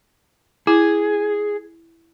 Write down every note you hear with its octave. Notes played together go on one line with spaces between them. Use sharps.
E4 G#4